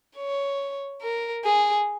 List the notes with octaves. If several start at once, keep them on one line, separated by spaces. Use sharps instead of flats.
C#5
A#4
G#4